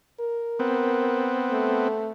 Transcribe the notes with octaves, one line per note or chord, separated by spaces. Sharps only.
A#4
B3 C4
A3